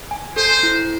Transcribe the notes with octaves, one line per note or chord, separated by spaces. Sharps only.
G#5
A4 C5
E4